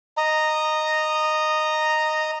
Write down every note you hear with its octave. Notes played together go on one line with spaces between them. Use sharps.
D#5 A#5